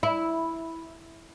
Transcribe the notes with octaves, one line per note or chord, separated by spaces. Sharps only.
E4